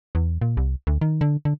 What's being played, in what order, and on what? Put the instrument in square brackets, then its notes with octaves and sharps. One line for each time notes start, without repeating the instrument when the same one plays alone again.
[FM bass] E2
A#2
C2
D2
D#3
D3
D3